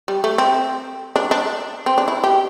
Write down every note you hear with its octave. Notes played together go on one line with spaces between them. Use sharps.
G3
A3
C4
D4
D4
C4
D4
E4
G4